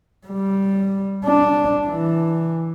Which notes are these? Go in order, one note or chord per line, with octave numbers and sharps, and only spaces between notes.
G3
D4
E3